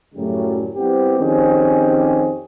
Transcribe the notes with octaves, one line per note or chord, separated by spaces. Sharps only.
F#2 A2 C#3 F#3 G3 A3
G3 B3 C4 E4 G4
F2 D#3 C4 C#4 G4 G#4